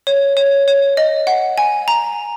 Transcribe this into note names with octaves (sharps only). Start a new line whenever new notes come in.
C#5
C#5
C#5
D#5
F#5
G#5
A#5